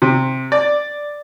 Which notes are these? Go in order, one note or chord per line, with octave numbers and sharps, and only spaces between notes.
C3
D5